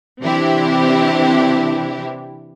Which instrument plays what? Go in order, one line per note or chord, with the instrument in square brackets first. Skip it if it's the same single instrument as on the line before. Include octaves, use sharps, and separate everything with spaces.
[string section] C3 E3 C4 D4 E4 G4